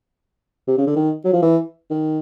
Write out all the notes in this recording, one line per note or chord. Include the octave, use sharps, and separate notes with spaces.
C3
C#3
D3
D#3
F#3
F3
E3
D#3